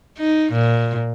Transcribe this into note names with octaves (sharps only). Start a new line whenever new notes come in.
D#4
A#2